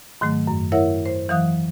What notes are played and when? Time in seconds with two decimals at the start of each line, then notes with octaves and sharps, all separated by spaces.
0.21 G#2 D#3 F#3 A3
0.47 F#2
0.72 E4 A#4 C#5 E5 F#5
1.05 C5
1.29 E3 F#3 F5 D#6 F#6